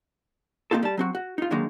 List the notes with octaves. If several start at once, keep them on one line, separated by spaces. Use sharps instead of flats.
A#3 C4 D#4 F4 A4
G3 A5
F#3 C4 F#4
F#4
D#4 F4
D3 D#3 F#3 G#3 A#3 D#4